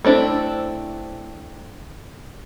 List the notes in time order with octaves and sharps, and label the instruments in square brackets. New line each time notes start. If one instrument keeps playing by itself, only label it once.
[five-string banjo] A3 C4 D4 E4